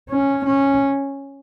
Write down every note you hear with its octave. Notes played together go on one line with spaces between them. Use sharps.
C#4
C#4